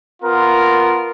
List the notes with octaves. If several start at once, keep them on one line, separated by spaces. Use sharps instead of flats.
B3 F4 A#4